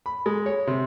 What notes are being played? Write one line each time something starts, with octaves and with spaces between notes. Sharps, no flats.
B5
G#3
C#5
C3